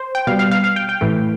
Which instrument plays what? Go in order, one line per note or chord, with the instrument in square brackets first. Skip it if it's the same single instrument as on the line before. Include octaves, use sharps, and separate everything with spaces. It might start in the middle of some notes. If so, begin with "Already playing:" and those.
Already playing: [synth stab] C5
G5
B2 G3 F5
F5
F5
F5
G5
G5
A2 E3 A3